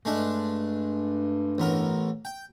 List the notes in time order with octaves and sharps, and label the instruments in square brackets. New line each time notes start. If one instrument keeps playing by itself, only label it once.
[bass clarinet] G2 [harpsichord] G#3 A3 D4
[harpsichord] A1 B3 A#4
G5